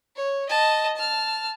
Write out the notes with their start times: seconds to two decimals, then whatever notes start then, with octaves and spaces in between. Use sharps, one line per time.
0.16 C#5
0.49 D#5 A5
0.96 A5 F6